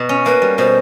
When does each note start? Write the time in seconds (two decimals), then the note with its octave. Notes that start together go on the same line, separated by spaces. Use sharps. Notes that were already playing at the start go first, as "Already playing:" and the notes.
Already playing: B2
0.09 C#4
0.26 A#3 B4
0.42 G3
0.58 B2 C5